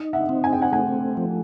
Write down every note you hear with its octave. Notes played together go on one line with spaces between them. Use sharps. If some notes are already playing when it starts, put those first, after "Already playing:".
Already playing: D#4
E5 F#5
C4
G#5
G5
F#5 G#5
A3 F#5 G#5
F3